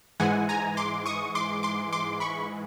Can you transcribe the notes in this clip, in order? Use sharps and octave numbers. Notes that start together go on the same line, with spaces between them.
G#2 E3 G#3 F#5 G#5
G#5 A#5
C6 D6
C#6 D#6
C6 D6
C6 D6
C6 D6
B5 C#6